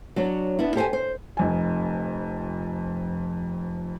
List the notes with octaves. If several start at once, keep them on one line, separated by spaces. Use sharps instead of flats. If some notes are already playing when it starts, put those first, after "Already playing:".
F#3 D4 C#5
B3 D4 E4
G4 A4 C5 D#5 G5 G#5
C5
F1 F2 G#5